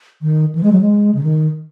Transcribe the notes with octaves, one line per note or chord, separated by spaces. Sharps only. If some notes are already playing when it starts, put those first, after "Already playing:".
D#3
E3
G#3
F#3
G#3
C#3
D#3